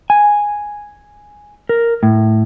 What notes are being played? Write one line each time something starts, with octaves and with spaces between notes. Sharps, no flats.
G#5
A#4
A2